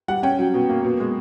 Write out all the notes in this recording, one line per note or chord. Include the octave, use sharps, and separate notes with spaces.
G3 F#5
C#4 G5
F#3
B2
A#3
B2
G#3